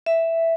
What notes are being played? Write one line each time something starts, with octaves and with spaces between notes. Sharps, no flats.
E5